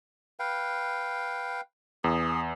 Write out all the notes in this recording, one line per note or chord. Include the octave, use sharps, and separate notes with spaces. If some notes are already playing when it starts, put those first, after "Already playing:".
B4 F5 G5
E2 G#4